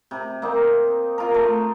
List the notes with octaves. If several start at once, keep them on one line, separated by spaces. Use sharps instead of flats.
C3
A#3 C4 D#4
F4 A#4
A3